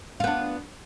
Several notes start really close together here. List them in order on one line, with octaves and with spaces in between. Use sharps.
F4 B3 D4